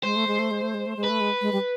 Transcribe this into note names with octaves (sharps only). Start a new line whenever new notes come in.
G#3 C5
A3
G#3
A3
G#3
A3
G#3
A3
G#3
B4
A3
G#3
G#3
G3